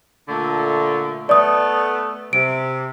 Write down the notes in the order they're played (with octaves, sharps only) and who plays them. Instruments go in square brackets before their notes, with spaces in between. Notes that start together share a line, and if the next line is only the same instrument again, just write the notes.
[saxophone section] A#2 D3 A3
[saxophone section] A3 B3 [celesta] D5 D#6
[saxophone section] C3 [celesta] D7